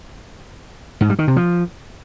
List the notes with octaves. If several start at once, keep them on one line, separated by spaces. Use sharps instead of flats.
G#2
G3
D#3
C3
F3